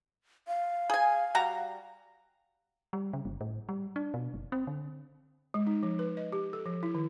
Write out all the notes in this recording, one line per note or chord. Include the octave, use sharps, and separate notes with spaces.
F5
G#4 G#5
G3 F#4 A#5
G3
C#3
G1
A2
G3
D4
B2
F#1
C4
D3
G#3
D#4
F3
B4
D#5
G4
A4
F3
E4
D#3